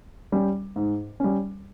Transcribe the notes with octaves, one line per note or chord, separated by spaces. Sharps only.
G3 C#4
G#2
G3 C#4